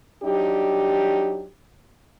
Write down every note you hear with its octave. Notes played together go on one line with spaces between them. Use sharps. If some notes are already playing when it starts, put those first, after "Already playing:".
F#3 D4 D#4 G4